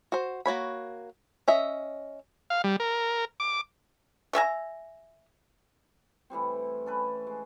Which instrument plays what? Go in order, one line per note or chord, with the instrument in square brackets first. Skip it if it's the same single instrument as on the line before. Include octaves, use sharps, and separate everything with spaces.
[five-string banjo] F#4 C5
A#3 F#4 C#5 B5
C#4 D#5 E5
[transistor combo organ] F5
G3
A#4
D6
[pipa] A3 E5 G#5 A#5
[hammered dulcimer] A2 E3 G3 C4
C#4 A4 B4
G#3